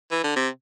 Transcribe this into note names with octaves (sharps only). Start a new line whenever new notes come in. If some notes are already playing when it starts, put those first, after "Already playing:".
E3
D3
C3